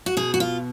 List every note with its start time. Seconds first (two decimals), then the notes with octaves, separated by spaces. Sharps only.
0.06 F#4
0.17 B2 G#4
0.34 F#4
0.40 F4